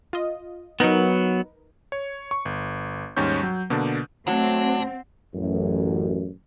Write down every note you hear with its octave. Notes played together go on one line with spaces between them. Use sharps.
F4 D#5
F#3 B3 D#4 A#4 B4
C#5
C#6
G1
D#2 G#2 G3 C#4 C#6 G6
F#3
B2 D3 A#3 D4
F#3 A3 C4 D4
A1 F#2